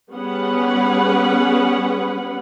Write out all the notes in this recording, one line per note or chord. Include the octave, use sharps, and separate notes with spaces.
G3 B3 C#4 G#4 B4 F#5